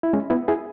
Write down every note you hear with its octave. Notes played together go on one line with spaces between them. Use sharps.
E4
G#3 C#4
B3 E4
E4 G#4